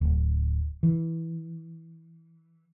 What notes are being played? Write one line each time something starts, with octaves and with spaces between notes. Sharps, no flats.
D1
E3